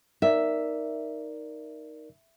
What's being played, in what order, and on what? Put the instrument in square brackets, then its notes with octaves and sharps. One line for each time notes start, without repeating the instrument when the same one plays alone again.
[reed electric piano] D#4 A#4 D5 [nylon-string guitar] E5